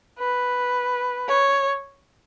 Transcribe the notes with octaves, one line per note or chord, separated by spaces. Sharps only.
B4
C#5